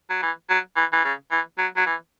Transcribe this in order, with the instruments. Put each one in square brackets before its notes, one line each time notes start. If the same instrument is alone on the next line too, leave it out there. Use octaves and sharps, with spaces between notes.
[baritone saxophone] F#3
E3
F#3
E3
E3
C#3
E3
F#3
F#3
E3